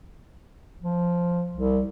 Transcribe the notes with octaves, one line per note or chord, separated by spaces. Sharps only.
F3
C2